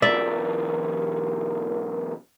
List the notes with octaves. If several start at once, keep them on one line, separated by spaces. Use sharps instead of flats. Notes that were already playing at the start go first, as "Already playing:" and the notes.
B1 E2 A#4 D5 E5